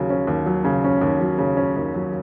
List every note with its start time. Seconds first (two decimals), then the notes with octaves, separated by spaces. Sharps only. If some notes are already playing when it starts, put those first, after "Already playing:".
Already playing: D#2 C#3 F#3
0.10 C#4
0.27 D#2
0.46 F#3
0.64 C#3
0.84 C#4
1.01 D#2
1.21 F#3
1.38 C#3
1.57 C#4
1.77 D#2
1.94 F#3